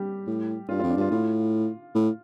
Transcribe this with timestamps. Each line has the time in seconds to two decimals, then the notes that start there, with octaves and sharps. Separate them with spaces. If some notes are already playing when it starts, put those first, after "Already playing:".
Already playing: G3 G4
0.27 A2
0.69 G2 F4
0.80 F4
0.83 F2
0.90 D4
0.97 G2 F4
1.11 A2 F4
1.95 A2